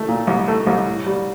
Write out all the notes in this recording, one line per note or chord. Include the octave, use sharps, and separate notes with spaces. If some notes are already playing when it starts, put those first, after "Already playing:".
Already playing: A3
A#2
C2
A3
C2
A2
G3